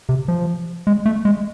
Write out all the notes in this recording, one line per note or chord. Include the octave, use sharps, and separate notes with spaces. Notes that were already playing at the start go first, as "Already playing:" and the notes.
C3
F3
G#3
A3
G#3